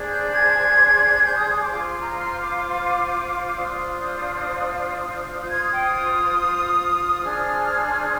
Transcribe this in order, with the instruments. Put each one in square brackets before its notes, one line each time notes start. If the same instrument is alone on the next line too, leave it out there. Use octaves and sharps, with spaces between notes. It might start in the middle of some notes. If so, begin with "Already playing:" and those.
Already playing: [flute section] D4 G#4 C5
G6
G#6
G6
D#6
D#6
D6
F4 C5 D6
C6
A#5
C6
D6
D4 F4 C5 D#6
F4 C5 G6
G#6
D#6
G5
D#6
D4 G#4 C5 F6